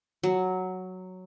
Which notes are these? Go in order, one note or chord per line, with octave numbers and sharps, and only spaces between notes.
F#3